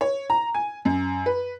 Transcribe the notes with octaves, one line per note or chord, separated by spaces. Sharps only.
C#5
A#5
G#5
F#2
B4